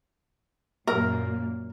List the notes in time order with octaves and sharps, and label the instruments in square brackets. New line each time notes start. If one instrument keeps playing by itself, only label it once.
[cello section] F#2 A#2 A#3 [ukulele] A#4